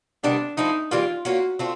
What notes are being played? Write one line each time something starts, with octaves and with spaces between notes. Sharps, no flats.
C3 D#3 G3 B3 D4
F3 A3 C4 D#4 E4
E3 G3 A#3 F4
A#3 C#4 F4 F#4
A3 C4 F4